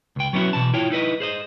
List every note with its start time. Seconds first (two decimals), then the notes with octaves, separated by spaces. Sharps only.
0.16 C#2 G5
0.33 F#3 B3 C#4 E4 F#4
0.53 B2 E3 A5
0.74 E4 F4 C#5 G5
0.90 D#4 E4 B4 D#5
1.20 G#4 C5 D#5